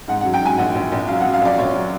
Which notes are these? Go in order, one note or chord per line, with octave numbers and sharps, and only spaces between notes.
G#2 F#5
F#5
F#3
G5
G#2 G#5
A#1 F#5
A#1
A#1
F#3 F5
F#5
F#3
F5
A#1 D5
A#1 C#5
F#3